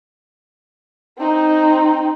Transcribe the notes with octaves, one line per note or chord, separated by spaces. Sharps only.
C4 D#4